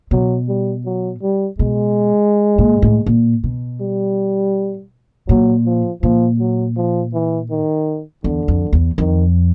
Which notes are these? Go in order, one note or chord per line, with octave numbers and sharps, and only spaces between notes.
B2 F#3
G3
F#3
G3
B2 G#3
A#2
A2
A#2
B2
G3
A#2 F#3
F3
A#2 F3
F#3
F3
E3
D#3
E2 D3
F2
E2
F2 D#3